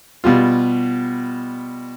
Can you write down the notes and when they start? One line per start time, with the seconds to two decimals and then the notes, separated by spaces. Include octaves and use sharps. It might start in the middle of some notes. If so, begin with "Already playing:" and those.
0.24 B2 G3 F4